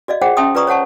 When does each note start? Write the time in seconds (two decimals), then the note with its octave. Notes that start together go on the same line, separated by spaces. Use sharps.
0.08 F#4 D5 D#5 F5
0.22 F4 G#4 C5 F#5 G5
0.37 C#4 E5 G5 A5 C6 D#6
0.55 F4 B4 D5 A#5 C#6 D#6
0.67 C5 C#5 F#5 A5 C#6